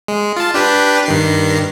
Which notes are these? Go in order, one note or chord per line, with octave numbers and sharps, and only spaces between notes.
G#3
F4 A5
D4 G4 B4
G2 D#3 C7